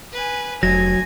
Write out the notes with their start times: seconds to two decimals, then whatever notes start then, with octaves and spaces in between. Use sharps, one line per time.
0.12 B4 G#5
0.63 F1 D2 F#3 G#5 G#6 A#6